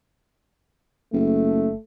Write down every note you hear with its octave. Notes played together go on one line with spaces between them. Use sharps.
F#1 A3